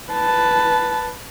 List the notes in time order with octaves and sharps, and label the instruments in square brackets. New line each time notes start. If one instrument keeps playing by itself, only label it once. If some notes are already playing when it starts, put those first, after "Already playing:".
[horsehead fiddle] B4 A5